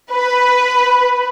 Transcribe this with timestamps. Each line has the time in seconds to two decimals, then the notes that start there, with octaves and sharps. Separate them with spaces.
0.11 B4